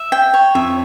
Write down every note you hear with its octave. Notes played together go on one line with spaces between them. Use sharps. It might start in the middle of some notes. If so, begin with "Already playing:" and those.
Already playing: E5
G5
C#5
F2 E5